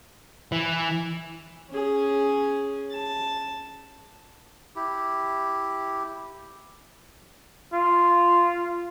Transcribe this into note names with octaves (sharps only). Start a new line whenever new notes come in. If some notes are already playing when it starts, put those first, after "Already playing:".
E3
C#4 G#4
A5
E4 G4
F4